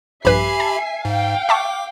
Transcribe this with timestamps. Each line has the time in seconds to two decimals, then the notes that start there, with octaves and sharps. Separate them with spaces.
0.25 A#1 G2 G4 B4 E5 G#5 B5 C7
0.60 A5
1.05 G#2 F5 G5
1.49 E5 A5 C#6 D6